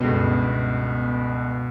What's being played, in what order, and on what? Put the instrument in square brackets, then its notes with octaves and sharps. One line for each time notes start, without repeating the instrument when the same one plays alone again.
[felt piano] G1 C#2 B3 [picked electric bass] B2